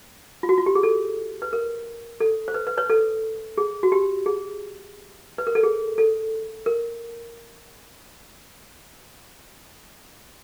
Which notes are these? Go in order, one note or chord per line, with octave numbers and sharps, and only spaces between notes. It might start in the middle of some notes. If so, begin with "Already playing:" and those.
F4
F#4
F4
G4
G#4
A4
B4
A#4
A4
C5
B4
B4
B4 C#5
A4
G#4
F#4
G4
G#4
B4
A#4
A4
G#4
A4
A#4